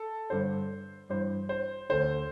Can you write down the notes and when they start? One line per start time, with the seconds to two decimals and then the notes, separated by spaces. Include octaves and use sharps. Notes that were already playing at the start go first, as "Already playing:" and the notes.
Already playing: A4
0.30 G2 D3 C5
1.09 G2 E3 C5
1.49 C5
1.89 D2 D3 C5